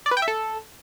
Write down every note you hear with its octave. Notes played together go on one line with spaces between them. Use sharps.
D5
B4
G5
E5
A4